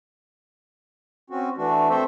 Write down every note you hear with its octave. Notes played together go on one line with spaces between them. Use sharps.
C4 C#4 F#4
E3 A3 D4 F#4
A3 C4 A4 C5 E5